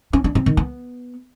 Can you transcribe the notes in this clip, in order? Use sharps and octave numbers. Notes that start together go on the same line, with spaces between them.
C#4
D4
C4
D#3
B3